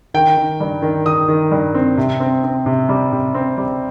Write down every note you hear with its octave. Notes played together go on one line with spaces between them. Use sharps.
D#3 G5
D#3
G2
D#3
D#3 D#6
D#3
G2
C4
C3
C4
C4
C3
G3
C3
C4
G3